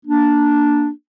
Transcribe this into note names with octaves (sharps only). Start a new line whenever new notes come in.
A#3 D4